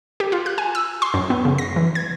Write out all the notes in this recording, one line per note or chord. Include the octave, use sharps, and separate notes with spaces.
G4
F4
F#6
G#5
E6
C6
F#2
B3
C#3
A#6
E3
G#6